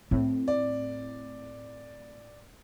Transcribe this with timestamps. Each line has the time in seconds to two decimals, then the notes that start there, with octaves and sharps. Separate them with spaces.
0.11 A2 C4
0.48 D5